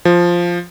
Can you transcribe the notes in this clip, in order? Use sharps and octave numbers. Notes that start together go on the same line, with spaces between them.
F3